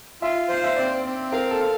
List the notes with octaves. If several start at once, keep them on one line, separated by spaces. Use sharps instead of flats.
F4 E5
C5 F5
E5
C4 D5
C4
A#4 F5
A4
F5